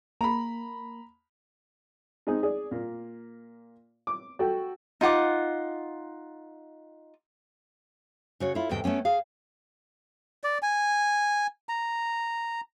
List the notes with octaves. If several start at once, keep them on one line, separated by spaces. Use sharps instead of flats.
A#3 A#5 B5
G#3 C4 D#4 G#4
G#4 D5
A#2 A#3
D6
F#4 A4 G5
D#4 F4 F#5 D6
C#3 F#4 C#5
E4 F4 A4
E2 G#2 C3 G5
A3 B3 C#4 G5
G#4 F5
D5
G#5
A#5